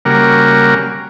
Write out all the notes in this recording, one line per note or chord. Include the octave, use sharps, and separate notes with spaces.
C#3 G3 A#3 F#4 A#4